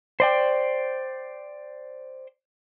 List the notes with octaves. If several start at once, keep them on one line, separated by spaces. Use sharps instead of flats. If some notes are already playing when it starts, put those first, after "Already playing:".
C5 D5 G5